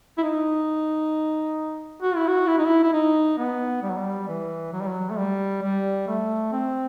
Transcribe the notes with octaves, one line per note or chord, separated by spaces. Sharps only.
E4
D#4
F#4
E4
F#4
E4
D#4
E4
E4
D#4
B3
G3
F#3
G3
E3
F#3
G3
F#3
A3
G3
G3
A3
C4